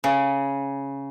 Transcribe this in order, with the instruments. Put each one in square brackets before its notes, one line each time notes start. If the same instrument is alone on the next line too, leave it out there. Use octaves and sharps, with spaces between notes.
[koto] C#3